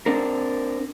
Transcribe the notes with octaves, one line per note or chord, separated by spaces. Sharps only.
C4 D4 A#4